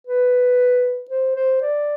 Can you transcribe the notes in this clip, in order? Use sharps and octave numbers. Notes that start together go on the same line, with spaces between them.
B4
C5
C5
D5